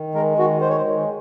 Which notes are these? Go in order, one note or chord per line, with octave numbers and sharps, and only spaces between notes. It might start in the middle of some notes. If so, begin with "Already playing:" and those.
Already playing: D#3
G#3 A#4
D#3 F#4
G#3 C5
C#5
C5
D#3